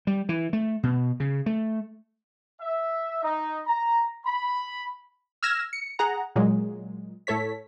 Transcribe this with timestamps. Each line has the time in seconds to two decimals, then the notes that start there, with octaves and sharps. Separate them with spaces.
0.07 G3
0.29 E3
0.53 A3
0.83 B2
1.20 C#3
1.46 A3
2.61 E5
3.22 D#4
3.66 A#5
4.26 B5
5.43 E6 F6 G#6 A#6 E7
5.73 C#7
5.99 G#4 F#5 A#5
6.36 A#2 F#3 G#3
7.27 A2 A4 C#5 B6